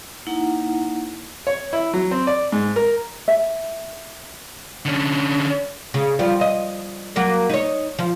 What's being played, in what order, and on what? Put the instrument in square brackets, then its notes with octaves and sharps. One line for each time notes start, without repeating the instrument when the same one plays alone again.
[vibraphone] A#3 D#4 E4 F#5 A#5
[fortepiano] C#5
E4
F#3
C4
D5
G#2
A#4
[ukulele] E5
[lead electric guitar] D3 C#4
[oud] C#3
F3 G3
D#5
F#3 A#3 A#4
D#4 C#5
F3